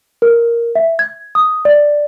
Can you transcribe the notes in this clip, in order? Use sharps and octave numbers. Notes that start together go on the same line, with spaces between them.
A#4
E5
G#6
D#6
D5